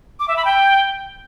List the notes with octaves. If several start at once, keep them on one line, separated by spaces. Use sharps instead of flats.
D6
E5
B5
G5